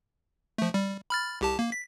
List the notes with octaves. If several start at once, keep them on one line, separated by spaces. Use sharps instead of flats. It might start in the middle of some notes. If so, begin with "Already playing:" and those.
F3 A3
G3
B5 F6 A6
C2 G4 A5
A#3
B6